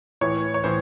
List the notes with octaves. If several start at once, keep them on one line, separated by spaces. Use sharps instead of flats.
A2 E3 C#5
C#5
A2 E3 C5